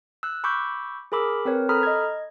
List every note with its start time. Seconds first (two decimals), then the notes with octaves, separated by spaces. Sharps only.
0.23 E6 F#6
0.44 B5 C#6 D6 E6 G6
1.12 G#4 A#4 B5 D6 E6
1.45 C4 A#4 B4 C#5
1.69 A4 A#5 B5 D#6 F6
1.83 D#5 G#6